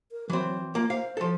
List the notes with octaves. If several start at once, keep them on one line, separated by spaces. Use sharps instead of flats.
A#4
E3 F#3 C4
A#3 F4
C5 F5
F3 A4